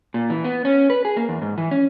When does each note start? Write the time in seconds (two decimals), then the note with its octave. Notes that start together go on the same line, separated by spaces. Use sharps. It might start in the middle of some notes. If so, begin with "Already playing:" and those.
0.14 A#2
0.30 E3
0.45 B3
0.65 C#4
0.90 B4
1.05 G#4
1.17 A#3
1.29 E2
1.42 G#2
1.58 E3
1.71 C#4